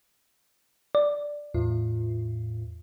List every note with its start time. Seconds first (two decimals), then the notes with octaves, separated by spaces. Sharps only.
0.95 D5
1.54 E2 A2 F4